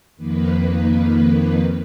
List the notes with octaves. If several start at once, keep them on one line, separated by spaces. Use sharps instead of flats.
F2 D#3 A#3 B4